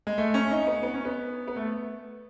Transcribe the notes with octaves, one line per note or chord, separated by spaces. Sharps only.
G#3
A3
C#4
D#4
B3
B3
C#4
B3
B3
A3